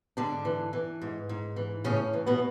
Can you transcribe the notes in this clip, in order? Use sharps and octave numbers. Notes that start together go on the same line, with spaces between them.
G#2 D3 D4
E3
E3
G#2
G#2
E3
A2 C#3 C#4
E3
B2 B3